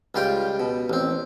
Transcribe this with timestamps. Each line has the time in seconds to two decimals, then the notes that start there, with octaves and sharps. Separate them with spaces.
0.15 C#2 G3 F4 G5
0.60 B2
0.90 A1 C4